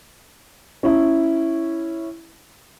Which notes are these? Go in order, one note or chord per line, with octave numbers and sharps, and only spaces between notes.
C#4 E4